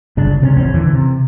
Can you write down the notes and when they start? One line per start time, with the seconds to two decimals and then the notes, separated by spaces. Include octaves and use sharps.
0.17 G1 C#3 D4
0.41 C3 B3 C#4
0.56 A1 E2 C4 C#4
0.74 D3 E3
0.93 C3